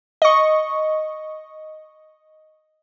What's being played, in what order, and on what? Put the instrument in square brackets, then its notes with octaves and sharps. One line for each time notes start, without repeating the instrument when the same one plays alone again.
[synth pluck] D#5 C#6